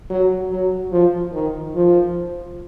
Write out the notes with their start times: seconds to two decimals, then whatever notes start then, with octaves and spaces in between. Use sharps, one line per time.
0.10 F#3
0.51 F#3
0.92 F3
1.33 D#3
1.75 F3